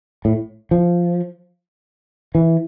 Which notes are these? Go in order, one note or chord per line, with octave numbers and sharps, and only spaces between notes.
A2
F3
E3